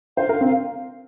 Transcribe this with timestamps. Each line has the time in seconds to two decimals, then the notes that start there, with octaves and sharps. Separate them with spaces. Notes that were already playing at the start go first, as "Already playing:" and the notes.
0.17 C5 F5
0.29 A#4
0.41 C4
0.46 F5